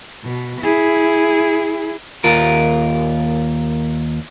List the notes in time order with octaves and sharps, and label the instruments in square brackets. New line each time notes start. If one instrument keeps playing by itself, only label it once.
[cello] B2
E4 G#4
[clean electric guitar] D#2 F4 A#4